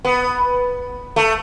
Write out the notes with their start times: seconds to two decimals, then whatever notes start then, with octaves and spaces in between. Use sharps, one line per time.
0.05 B3
1.16 A3